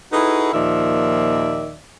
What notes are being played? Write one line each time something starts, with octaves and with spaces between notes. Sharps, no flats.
D#4 E4 F#4 G#4 A4 B4
D#2 A#2 D#3 F3 D5 E5